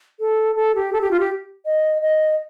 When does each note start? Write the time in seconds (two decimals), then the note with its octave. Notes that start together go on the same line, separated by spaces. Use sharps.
0.20 A4
0.56 A4
0.75 G4
0.93 A4
1.01 G4
1.11 F4
1.20 G4
1.65 D#5
2.02 D#5